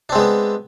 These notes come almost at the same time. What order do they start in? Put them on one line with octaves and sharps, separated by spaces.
D4 C4 G#3 B3